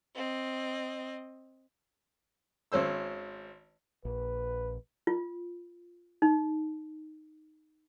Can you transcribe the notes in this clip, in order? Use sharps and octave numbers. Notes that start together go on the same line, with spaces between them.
C4 D#5
G#1 C#4 C5 E6
A#1 B4
F4
D#4